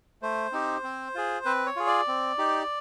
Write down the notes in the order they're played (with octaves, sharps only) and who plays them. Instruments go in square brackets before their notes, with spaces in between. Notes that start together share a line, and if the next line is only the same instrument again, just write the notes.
[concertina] A3 C5
C4 D#4 G4
C4
F4 G#4
C4 B4
C#5
F4 G#4
D5
C4
D#4 G4